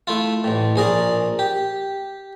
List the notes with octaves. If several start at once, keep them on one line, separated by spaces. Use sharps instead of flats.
A3 E4 F4
A1 A2
A#1 G#4 A#4 D5
G4